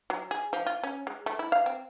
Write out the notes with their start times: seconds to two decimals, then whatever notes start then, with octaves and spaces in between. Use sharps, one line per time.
0.10 F#3
0.31 G#4
0.53 F3
0.66 F4
0.83 C#4
1.07 G#3
1.26 A3
1.39 E4
1.52 F5
1.66 C4